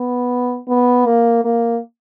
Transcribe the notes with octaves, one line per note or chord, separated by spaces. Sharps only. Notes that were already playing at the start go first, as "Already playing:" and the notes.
Already playing: B3
B3
A#3
A#3